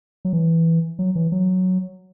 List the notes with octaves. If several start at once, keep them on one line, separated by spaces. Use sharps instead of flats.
F#3
E3
F#3
E3
F#3